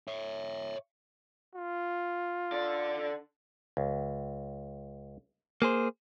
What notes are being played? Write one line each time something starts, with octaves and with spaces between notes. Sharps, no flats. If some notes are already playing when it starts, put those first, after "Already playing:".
C#5 E5
F4
D3 D5
C#2
A#3 G#4 C5